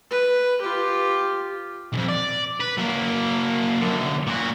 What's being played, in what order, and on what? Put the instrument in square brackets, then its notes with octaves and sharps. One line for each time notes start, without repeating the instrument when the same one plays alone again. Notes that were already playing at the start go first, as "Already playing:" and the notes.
[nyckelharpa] B4
F4 G4
[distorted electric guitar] B1 F2
D5
B4
F#3 A#3
F#2 D3
A#2 F#4